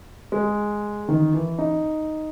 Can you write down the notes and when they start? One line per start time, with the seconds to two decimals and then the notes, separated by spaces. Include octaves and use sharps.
0.32 G#3
1.08 D#3
1.33 E3
1.59 D#4